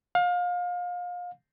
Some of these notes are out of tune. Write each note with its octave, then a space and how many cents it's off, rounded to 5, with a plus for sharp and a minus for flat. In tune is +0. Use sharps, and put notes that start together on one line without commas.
F5 +30